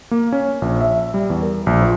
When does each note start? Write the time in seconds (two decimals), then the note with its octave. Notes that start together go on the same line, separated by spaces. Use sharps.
0.11 A#3
0.32 C#4
0.62 A#1
0.81 E5
1.14 G3
1.30 E2
1.42 A#4
1.67 A#1
1.82 F3